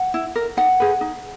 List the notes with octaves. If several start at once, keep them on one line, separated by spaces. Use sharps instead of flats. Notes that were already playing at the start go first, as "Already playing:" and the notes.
Already playing: F#5
E4
A#4
D#4 F#5
G#4 B4
D#4